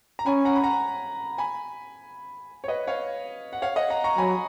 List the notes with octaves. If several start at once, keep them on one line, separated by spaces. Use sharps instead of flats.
A#5
C#4 G#5 B5
F#5 A#5
B5
F#5 A#5
G#5 B5
C#5
B4 D#5
C#5 F5
F#5
C#5 F5
D#5 F#5
F#5 A#5
A#5 C#6
F#3 G#5 B5